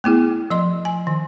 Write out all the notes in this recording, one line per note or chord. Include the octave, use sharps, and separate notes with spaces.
A3 B3 E4 G#4
F3 D#5 C6
G#5
D#3